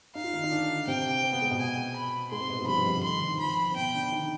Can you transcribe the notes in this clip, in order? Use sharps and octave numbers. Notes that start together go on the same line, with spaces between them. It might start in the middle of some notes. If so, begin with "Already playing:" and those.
D#4 F5
F4
D#3 D#4
D#4
D3 D4
C3 C4 G5
C4
B3
G#3
B2 B3
G#5
B5
G#2 G#3 C6
C3 C4
B2 B3
G#2 G#3
F3
G2 G3 B5
F2 F3
D3
D#3 C6
D#3
D#3
F3
D#3 B5
C4
B2 B3 G5
D3 D4
D#3 D#4